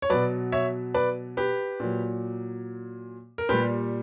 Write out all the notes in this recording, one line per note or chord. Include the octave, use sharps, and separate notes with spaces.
C#5
B2 F#3 B4 D5
C#5 E5
B4 D5
G4 B4
A#2 F#3
A#4
A#2 G3 G4 B4